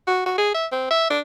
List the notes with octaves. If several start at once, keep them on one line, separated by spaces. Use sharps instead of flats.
F#4
F#4
G#4
E5
C4
E5
D4